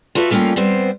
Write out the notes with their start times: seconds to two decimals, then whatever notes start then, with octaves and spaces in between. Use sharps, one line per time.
0.15 F4 F#4 A4 B4 E5
0.30 G3 A3 A#3 C#4 F4 G4
0.56 G3 B3 C4 C5